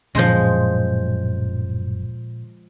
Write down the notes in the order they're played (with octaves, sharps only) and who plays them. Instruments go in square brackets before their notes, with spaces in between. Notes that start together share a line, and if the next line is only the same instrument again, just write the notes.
[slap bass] D1 F#2 C#4 [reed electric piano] A#2 C6 G6 [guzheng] F3 G#3